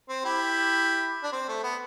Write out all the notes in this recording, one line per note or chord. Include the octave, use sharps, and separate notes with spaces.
C4
E4 G4
D4
C4
A3
B3